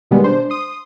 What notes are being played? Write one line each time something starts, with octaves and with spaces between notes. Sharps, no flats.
B2 D#3 G3 G#3 B3
D4 C5
C6 D#6